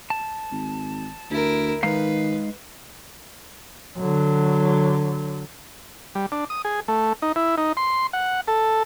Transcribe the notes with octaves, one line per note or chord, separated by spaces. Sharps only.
A5
G#1
D2 E4 A#4
D#3 G#3 D#4 B4 F5
D3 F#3
G3
D4
D#6
G#4
A3
D#4
E4
D#4
C6
F#5
A4